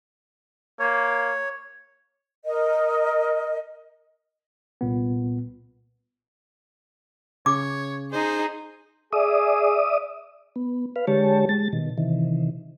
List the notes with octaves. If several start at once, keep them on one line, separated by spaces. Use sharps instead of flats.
A#3 C#5
A#4 D#5
C2 A#2 B3
C#3 C#5 D6
D#4 G#4 C5
G#4 D5 E5 D#6
B3
B4 F5
D3 G#3 G4 C#5 A5
G#3 A6
B2 D#3
C3 D#3 E3